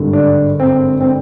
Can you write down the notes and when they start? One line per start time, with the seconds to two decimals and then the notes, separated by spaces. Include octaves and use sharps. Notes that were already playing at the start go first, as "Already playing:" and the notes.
Already playing: G#1 G2 D3
0.13 D4
0.60 C4
1.01 C4